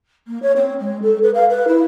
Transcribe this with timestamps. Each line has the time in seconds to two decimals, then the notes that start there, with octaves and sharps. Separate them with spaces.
0.27 A#3
0.42 C#5
0.56 C4
0.80 G#3
1.02 A4
1.23 B4
1.35 F5
1.50 B4
1.68 E4